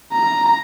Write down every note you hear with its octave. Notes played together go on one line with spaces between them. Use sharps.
A#5